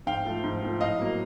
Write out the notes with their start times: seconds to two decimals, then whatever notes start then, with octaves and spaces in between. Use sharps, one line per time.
0.07 G#2 F5 G5
0.25 F3 A3
0.44 G#2
0.62 F3 A3
0.81 A2 D#5 F5
0.99 F#3 A#3